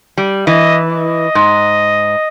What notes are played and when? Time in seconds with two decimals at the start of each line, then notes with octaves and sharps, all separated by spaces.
0.17 G3
0.47 E3 D#5
0.91 D#5
1.35 G#2